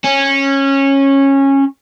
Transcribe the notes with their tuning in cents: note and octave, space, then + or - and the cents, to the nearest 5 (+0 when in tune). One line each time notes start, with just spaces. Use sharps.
C#4 -15